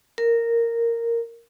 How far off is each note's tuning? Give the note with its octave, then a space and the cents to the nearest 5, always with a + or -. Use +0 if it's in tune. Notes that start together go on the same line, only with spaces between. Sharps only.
A#4 -10